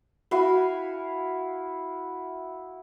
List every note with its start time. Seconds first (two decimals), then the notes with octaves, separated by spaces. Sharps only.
0.31 E4 F#4 F5 G#5